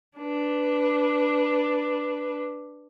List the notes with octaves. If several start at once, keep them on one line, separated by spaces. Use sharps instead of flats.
D4 B4